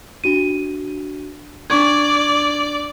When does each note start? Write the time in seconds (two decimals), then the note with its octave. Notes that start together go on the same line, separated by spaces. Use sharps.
0.24 D4 F#4 D#7
1.70 D4 D5 C#6 G#6